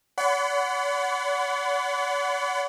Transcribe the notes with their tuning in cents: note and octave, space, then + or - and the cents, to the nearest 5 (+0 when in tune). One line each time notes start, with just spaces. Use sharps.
D5 -45 F#5 +0 B5 +45